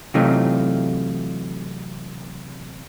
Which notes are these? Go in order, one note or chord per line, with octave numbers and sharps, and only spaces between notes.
C3 E3 F#3 A3 D#4 F4